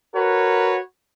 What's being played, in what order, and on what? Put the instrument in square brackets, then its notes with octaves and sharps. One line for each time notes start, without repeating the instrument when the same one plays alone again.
[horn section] F#4 A#4 B4 C#5